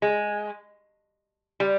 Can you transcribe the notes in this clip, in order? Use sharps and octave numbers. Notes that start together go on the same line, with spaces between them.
G#3
G3